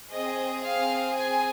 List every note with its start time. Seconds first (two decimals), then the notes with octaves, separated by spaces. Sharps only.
0.11 C4 G#4 D#5
0.63 F5
1.15 G#5